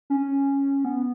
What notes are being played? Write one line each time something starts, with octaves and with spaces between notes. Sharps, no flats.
C#4
B3